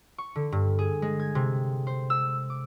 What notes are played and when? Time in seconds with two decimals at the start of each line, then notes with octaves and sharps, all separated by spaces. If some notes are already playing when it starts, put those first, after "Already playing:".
0.18 C#6
0.35 D3
0.52 G2
0.79 G#4
1.02 G#3
1.20 G#6
1.35 C3
1.87 C5
2.10 E6
2.50 D6